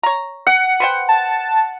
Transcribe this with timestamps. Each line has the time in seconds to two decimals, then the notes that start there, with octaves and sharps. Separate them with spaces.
0.03 C#5 A#5
0.47 F#5
0.80 B4 C5 G5
1.08 A5